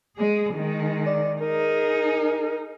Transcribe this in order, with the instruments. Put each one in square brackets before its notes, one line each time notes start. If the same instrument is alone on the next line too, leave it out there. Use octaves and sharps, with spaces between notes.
[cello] G#3 G#4
D#3 G#3
[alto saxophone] D5
[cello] D#4 G#4 [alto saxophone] A#4